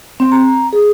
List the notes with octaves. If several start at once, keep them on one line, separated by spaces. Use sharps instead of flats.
C4
A#5
G#4